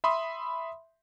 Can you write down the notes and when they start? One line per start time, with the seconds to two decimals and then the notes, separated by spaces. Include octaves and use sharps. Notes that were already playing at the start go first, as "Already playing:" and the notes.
0.04 E5 B5 C6 D#6